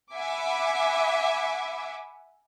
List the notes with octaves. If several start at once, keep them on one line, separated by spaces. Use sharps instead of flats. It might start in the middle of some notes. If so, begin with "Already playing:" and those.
E5 F#5 G#5 B5 D6